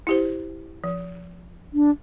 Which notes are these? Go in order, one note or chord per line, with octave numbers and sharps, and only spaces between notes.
E4 G4 C5
F3
D4